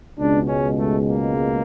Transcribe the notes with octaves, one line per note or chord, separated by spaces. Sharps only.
C#2 B2 G#3 D4
C#4
A3
A#3